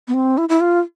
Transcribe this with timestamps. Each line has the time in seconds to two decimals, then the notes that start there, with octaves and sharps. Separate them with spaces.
0.08 B3
0.14 C4
0.38 E4
0.49 E4
0.60 F4